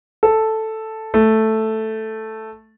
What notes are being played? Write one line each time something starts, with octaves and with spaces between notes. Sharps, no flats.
A4
A3